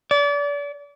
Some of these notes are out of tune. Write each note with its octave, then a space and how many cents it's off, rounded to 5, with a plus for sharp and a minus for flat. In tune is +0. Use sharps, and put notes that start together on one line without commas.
D5 -35